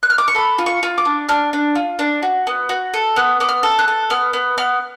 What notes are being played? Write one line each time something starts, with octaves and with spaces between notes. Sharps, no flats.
F#6
F6
D6
C#6
A4 B5
F4
C#6
F4
D6
D4
D4 F6
D4
F4
D4
F#4
B3
F#4
A4
B3 F#6
B3 D6
F6
A4
F#6
A4
B3 F6
B3
B3 F6